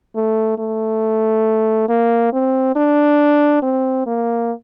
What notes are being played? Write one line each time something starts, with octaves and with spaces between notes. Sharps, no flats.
A3
A3
A#3
C4
D4
C4
A#3